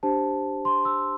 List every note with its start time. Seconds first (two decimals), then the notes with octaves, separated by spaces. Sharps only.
0.03 D4 G4 C5 A5
0.65 C6
0.85 E6